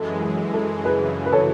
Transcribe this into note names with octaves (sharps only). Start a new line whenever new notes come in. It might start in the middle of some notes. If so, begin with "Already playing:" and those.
Already playing: F#2 E3 G#3 A4
G#4
A4
F#2 C#3 E3 G#4 B4
B4
A4 C#5